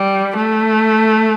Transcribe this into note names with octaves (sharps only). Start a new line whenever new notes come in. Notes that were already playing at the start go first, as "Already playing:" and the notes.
Already playing: G3
A3